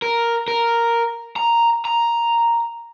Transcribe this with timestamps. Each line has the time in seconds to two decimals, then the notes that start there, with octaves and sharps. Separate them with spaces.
0.02 A#4
0.48 A#4
1.36 A#5
1.85 A#5